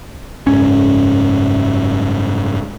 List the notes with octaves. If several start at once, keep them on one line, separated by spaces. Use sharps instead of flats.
F#1 G#2 C#4